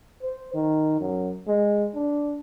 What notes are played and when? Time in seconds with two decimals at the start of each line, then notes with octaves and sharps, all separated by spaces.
0.22 C5
0.54 D#3
1.00 F#2
1.47 G#3
1.95 D4